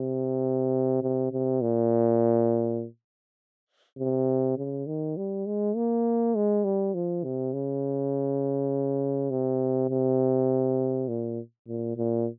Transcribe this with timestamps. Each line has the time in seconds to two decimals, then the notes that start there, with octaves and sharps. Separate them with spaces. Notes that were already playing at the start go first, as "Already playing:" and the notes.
Already playing: C3
1.02 C3
1.32 C3
1.61 A#2
3.98 C3
4.57 C#3
4.86 D#3
5.17 G3
5.46 G#3
5.76 A#3
6.35 G#3
6.64 G3
6.94 F3
7.24 C3
7.53 C#3
9.30 C3
9.89 C3
11.08 A#2
11.68 A#2
11.97 A#2